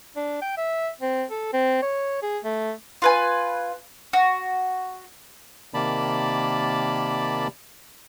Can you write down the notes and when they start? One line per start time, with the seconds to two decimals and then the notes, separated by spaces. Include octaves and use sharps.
0.16 D4
0.42 G5
0.57 E5
1.01 C4
1.30 A4
1.53 C4
1.83 C#5
2.22 G#4
2.44 A3
3.02 F4 B4 G#5
4.13 F#4
5.74 C3 D#3 A#3 D5 A5 B5